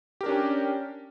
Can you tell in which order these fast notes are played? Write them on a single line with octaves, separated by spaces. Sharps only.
G4 A#4 D4 C#4